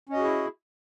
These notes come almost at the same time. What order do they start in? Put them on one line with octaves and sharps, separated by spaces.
C#4 D#5 F#4 G#4 E4